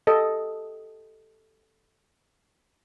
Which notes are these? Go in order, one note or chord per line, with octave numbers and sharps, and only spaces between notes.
G4 A4 D#5